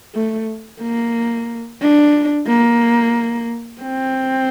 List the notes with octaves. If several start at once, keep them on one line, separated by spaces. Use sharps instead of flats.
A3
A#3
D4
A#3
C4